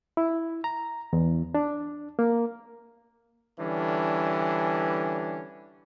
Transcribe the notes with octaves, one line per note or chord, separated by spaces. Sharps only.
E4
A#5
E2
D4
A#3
D3 E3 G3 C#4 D4